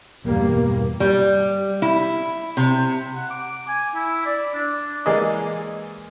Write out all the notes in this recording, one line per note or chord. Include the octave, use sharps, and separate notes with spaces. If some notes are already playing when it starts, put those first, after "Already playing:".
E2 G2 B2 G3 A#3
G3
E4
C3
F#5
D6
G#5
E4
D5
D4
E3 G#3 A#3 G#4 D5 D#5